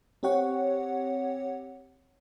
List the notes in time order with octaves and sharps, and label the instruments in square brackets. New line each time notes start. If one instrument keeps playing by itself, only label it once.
[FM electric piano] C4 G4 C#5 F#5